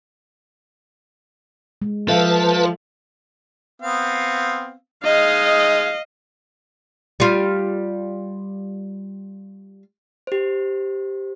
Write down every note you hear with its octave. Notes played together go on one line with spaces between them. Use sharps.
G#3
F3 A4 B4 E5 F5 A5
B3 C4 F5
G#3 D#4 D#5 F5
G3 F4
G4 C5